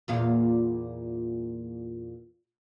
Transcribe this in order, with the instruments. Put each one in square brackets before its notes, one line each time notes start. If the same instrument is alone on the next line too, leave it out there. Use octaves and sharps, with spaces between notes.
[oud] E2 A#2 F4